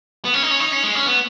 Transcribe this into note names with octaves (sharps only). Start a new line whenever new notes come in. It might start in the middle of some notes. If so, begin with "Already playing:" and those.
B3
C#4
D#4
C#4
D#4
C#4
G#3
C#4
B3